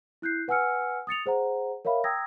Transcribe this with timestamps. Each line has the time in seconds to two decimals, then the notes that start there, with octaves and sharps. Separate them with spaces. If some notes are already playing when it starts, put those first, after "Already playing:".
0.22 E4 F#6 G6 C7
0.48 B4 F#5 G#5 E6 F6 C#7
1.07 D#6 A6 C#7 F7
1.26 G#4 C5 F#5 A#5
1.85 A#4 C#5 E5 F5 B5
2.04 G5 A#5 D#6 E6 G#6 A#6